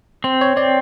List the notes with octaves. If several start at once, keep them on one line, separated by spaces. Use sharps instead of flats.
C4 C5
C#5
C4 D5